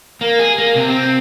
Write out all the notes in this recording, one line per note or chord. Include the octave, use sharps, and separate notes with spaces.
A#3
G#4
A#3
C3
C4